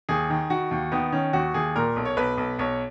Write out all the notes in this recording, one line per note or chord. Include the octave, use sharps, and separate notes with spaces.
D#2 G#4
D#3
D#3 F#4
D#2
D#3 B3
D#3 C#4
D#2 F#4
D#2 G#4
A#2 A#4
B1
C#5
B1 B4
B1
B1 C#5